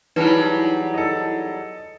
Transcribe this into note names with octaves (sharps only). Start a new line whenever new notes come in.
E2 F#3 G3 D#4 E4 B4 A5
A4 D#5